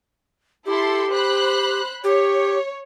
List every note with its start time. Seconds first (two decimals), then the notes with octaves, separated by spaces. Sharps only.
0.66 E4 G4 A4 C6
1.12 C5 B5 F#6
2.04 G4 C#5